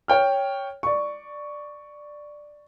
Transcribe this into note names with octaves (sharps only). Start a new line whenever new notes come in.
C#5 G5 F6
D5 C#6